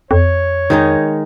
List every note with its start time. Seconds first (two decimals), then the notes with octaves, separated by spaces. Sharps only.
0.11 F2 C#5
0.70 D#3 G#3 D#4